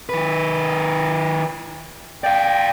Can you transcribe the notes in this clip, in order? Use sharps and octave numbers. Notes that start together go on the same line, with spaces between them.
D#3 B4
D5 F5 G5